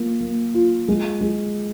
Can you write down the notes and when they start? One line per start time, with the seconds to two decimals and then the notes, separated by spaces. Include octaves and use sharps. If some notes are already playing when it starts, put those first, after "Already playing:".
Already playing: A#3 F4
0.21 A#3
0.54 F4
0.88 G#3
1.21 G#3